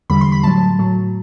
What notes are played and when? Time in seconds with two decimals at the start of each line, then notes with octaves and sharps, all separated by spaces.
0.10 E2 D3 G3 B5
0.21 C6
0.32 B5
0.43 A2 F#3 A5
0.79 A2 F#3